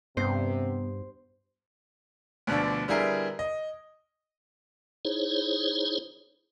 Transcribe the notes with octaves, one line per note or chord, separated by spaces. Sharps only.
G2 C3 B3 C5
D2 B2 D3 F3 D4
D3 G3 B3 E4 G#4 A#4
D#5
D#4 E4 G#4 C5 C#5